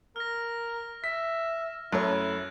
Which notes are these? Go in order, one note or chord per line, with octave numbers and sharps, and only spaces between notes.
A#4 F6 A#6
E5 B6
F#2 A3 E4 C#5 F#6 G#6